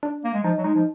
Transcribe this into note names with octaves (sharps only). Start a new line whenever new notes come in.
D4
A#3
G#3
F3 D#4
F#3
G#3 D#4
F3